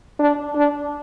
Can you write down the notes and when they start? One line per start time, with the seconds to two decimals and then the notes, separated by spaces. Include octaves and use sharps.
0.20 D4
0.56 D4